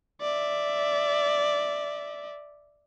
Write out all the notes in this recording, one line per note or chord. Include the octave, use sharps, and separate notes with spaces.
D5 E5